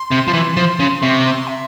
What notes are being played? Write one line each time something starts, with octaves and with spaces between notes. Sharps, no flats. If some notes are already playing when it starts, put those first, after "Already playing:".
Already playing: C6
C3
F3
E3
F3
C#3
C3 C#6
C6
E5